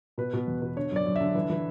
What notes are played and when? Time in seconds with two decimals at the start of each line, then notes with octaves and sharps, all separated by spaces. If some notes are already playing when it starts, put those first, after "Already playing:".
0.18 B2 B4
0.33 B2
0.47 E2
0.62 B2
0.76 D3 C#5
0.91 F#2 D5
1.06 F#2
1.16 D3 E5
1.35 E3
1.50 E3